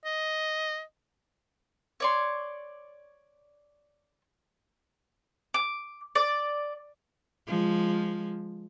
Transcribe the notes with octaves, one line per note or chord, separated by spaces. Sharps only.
D#5
C#5 D5 C6
D6
D5
F3 G#3